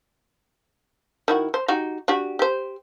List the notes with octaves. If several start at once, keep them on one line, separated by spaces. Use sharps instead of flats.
D#3 E4 F#4
C5
D#4 F#4 G4
D4 F#4 G4
G4 C5